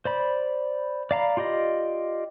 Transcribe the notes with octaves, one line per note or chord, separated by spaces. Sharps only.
C5 D5 B5
D5 F5 A#5 B5
F4 G4 D5 D#5